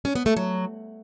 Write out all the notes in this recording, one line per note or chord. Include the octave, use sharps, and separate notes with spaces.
C#4
B3
A3
F#3